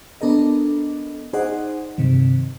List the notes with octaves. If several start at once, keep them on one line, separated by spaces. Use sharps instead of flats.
B3 D4 A4 A#4 D#5
D#4 G#4 C5 D5 D#5 F#5
G2 C3 D#3